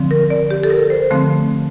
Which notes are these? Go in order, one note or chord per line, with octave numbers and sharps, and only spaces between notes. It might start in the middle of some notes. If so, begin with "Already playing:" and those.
Already playing: D3 F3 C4
A#4
D5
G4
A4
A#4
C5
D3 F3 A3 C4